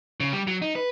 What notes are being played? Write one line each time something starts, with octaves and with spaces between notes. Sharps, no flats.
C#3
G3
F#3
D#4
B4